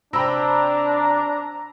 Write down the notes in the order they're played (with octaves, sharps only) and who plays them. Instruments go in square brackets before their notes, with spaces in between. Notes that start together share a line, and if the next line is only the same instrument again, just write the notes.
[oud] C3 C4 [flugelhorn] D4 [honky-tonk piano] G5 B5 E6 [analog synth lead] A#5